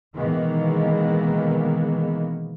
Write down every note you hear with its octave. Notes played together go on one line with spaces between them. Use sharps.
B2 D#3 E3 G#3 A#3 B3